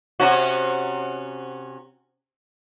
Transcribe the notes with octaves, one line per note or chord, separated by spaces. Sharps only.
C3 C#4 F#4